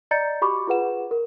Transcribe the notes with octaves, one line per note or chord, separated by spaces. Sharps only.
D5 D#5 A#5 G6 A6 C#7
F#4 G4 B5 C#6 D6
F4 G#4 B4 F#5 E7
A#4